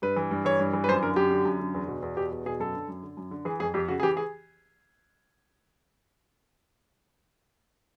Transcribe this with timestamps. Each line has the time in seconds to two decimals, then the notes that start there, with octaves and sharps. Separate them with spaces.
0.02 G2 B4
0.17 E3
0.31 G2
0.45 E3 C#5
0.60 G2
0.73 E3
0.84 B4
0.88 F#2 C5
1.03 D3 A#4
1.16 F#2 G4
1.31 D3
1.45 F#2
1.60 D3
1.74 E2
1.88 B2
2.02 E2
2.17 B2 G4
2.32 E2
2.46 B2 G#4
2.60 F#2 A4
2.74 D3
2.88 F#2
3.03 D3
3.17 F#2
3.31 D3
3.45 E3 G#4
3.60 F2 G#4
3.74 F2 G4
3.88 C#3 F#4
4.00 G#4
4.03 E3 G4
4.17 G#4